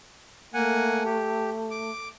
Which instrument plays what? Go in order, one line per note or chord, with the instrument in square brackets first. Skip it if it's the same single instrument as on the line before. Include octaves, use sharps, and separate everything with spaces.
[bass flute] A3 [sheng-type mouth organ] A#3 F#5 G#5
[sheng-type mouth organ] G4
D6